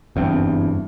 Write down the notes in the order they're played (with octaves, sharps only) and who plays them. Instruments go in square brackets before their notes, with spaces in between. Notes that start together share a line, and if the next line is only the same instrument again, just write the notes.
[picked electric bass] F#1 E2 G2 C4